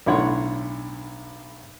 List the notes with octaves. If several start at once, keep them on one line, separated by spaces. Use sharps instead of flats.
B1 A2 D3 C#5 F#5 C6